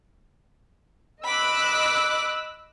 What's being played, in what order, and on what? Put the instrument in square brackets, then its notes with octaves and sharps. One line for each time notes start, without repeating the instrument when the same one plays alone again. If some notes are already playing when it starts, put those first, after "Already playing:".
[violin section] D#5 E6 F#6 [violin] B5 D6